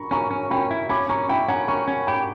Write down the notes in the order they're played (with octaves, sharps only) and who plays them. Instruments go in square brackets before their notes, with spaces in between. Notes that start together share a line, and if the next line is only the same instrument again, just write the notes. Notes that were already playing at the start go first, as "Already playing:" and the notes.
Already playing: [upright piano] A#5 B5 C#6
[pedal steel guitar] C#4 [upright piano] A#5 C#6
[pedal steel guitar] C#4
[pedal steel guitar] C#4 [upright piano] G5 B5
[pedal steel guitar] E4
[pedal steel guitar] C#4 [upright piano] B5 D6
[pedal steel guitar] C#4 [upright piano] A#5 C#6
[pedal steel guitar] E4 [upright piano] G5 B5
[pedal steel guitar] C#4 [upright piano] F#5 A#5
[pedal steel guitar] C#4 [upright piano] A#5 C#6
[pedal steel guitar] C#4
[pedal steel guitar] G4 [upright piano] G5 B5